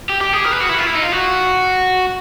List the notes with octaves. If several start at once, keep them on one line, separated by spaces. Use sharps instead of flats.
G4
G4
G#4
A#4
B4
F#4
E4
F4
E4
D#4
F4
F#4